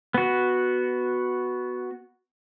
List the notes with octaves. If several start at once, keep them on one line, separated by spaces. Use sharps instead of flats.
B3 F#4